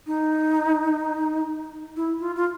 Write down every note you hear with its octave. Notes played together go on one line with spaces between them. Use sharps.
D#4
E4
F4
F4